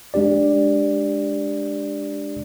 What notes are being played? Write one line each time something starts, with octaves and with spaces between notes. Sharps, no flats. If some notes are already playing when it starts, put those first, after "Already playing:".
G#3 D4 G4 D5